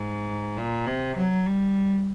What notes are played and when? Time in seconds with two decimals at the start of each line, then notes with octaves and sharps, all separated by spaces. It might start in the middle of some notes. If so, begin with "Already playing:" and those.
Already playing: G#2
0.58 A#2
0.87 C3
1.17 F#3
1.46 G3